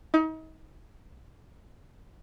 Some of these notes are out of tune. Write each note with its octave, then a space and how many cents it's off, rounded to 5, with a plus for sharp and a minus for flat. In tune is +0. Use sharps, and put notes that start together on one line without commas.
D#4 +35